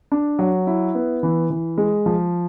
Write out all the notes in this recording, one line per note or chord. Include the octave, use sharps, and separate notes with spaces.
D4
F#3
E4
B3
E3
E3
G#3
F3